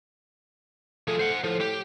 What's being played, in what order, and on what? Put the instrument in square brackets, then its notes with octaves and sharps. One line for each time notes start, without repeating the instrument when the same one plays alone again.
[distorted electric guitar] F3 G#4 [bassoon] A3
[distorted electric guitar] C5 F#5
[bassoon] A2 [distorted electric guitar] F3
[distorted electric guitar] G4